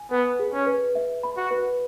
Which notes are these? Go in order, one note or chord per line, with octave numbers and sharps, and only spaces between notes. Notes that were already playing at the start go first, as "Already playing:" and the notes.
Already playing: G#5
B3 B4
G#4
C#4
B4
E5
B5
F#4
B4